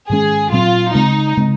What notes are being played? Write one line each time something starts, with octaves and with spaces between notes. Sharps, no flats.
G#2 D#3 G#3 C#4 G#4
A#2 F#3 C4 F4
C#3 G#3 C4 D#4
C#3 G#3 C4